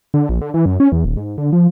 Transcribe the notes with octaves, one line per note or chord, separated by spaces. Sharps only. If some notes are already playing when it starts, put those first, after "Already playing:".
D3
A#1
D3
E3
F#2
C#4
E2
D#1
G#2
D3
F3